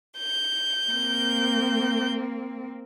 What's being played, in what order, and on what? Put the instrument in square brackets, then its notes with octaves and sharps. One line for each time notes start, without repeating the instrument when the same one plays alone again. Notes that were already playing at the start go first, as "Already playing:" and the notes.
[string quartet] G6
[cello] A#3 C4